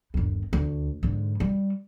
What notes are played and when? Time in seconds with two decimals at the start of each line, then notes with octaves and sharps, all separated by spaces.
0.14 G1 D#2
0.53 D2
1.03 G#2 D3
1.40 G3